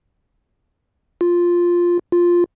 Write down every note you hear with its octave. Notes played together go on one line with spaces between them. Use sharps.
F4
F4